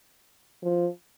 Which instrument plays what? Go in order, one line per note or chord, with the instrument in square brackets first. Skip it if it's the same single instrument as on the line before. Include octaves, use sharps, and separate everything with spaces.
[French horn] F3